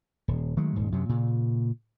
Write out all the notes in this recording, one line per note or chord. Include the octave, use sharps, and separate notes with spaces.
D#1
D#3 F#3 G#3 A3
D#1 G#2
F#2 C3 F#3
A#2 C#3